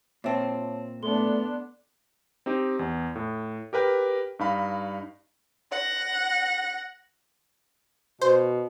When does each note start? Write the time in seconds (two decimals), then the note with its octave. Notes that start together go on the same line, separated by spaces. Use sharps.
0.24 A#2 C4 C#5 E5 A5
1.03 A3 B3 D4 A4 C6 G7
2.46 C4 D#4 G4
2.79 E2
3.15 A2
3.73 G4 A#4 B4 G5
4.39 G2 D#4 F5 B5
5.71 F#5 A#6
8.21 B2 C5